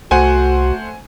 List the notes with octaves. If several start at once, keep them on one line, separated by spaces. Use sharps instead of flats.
C2 A3 F#4 C5 F#5 G#5